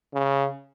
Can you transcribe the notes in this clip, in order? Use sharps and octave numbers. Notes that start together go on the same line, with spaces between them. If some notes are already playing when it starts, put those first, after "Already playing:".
C#3